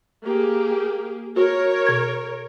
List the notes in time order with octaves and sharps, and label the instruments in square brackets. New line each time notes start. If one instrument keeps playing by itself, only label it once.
[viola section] A#3 G4 G#4
[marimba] F#4 [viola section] A#4 C#5
[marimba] B2 G#6